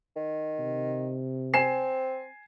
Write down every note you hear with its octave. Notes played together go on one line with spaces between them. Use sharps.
D#3
C3
C4 G#5 C7 E7